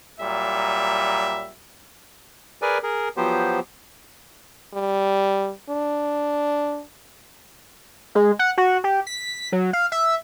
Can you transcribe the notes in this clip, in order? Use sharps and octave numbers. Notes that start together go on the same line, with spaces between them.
A#2 F#3 G3 E5
G#4 A#4 B4 D5 G#5
G#4 A#4
F3 F#3 B3 G4 C5
G3
D4
G#3
F#5
F#4
G4
B6
F#3
F5
E5